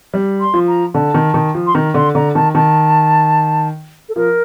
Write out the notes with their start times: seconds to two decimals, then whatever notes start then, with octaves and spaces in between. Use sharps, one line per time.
0.14 G3
0.40 C6
0.54 F3
0.68 A#5
0.94 D3 A5
1.14 D#3
1.34 D#3
1.55 F3
1.67 C6
1.75 D#3 A#5
1.94 D3 C6
2.15 D3 A#5
2.35 D#3 A5
2.55 D#3 A5
4.09 A4
4.16 F3 A#4